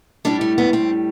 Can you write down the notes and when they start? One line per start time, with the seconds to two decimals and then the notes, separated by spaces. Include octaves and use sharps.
0.25 A2 G3 D4
0.41 A3
0.58 B3
0.73 C4